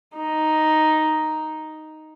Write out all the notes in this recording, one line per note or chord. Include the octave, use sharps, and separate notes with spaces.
D#4